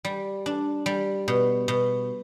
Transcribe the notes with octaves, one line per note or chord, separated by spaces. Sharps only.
G3
D4
G3
B2
B2